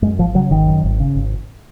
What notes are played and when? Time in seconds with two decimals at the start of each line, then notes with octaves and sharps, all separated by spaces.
0.02 F#2 G#3
0.18 G#1 F3
0.34 C#3 F#3
0.51 G#1 D#3
0.67 F#2
0.84 G#1
1.00 C#3
1.15 G#1